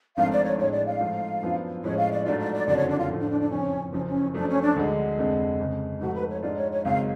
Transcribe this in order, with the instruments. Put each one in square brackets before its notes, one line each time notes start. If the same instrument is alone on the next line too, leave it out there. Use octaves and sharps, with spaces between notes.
[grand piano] G#1 G#2 F3 A3 D4 [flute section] F5
[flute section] D5
C#5
[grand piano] A2 G#3 D4 [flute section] C#5
[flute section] D5
F5
[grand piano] G#2 F3 A3 F4
F#2 F3 B3 D4 F4
[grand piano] A2 F3 G#3 C#4 [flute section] C#5
[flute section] F5
D5
[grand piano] G#2 F#3 A3 D4 F4 [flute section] D5
[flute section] D5
D5
[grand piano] F#1 F2 D3 F#3 [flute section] D5
[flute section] C#5
D4
F4
[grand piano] A2 F3 A3 F4
[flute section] D4
D4
D4
[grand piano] F#1 F2 F3 [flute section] C#4
[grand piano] F#1 F#2 F3 [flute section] C#4
[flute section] C#4
[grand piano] F#2 F3 A3 [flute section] D4
[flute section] C#4
D4
[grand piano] D2 D3 G#3
F1 F2 D3 G#3
F2 C#3 G#3
[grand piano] G#2 F3 A3 [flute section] F#4
[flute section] B4
C#5
[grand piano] G#2 G#3 D4 F4 [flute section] D5
[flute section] C#5
C#5
[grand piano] G#1 F#2 C#3 G#3 [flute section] F5